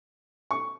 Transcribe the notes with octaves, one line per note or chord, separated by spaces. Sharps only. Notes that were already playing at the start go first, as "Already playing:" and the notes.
C#6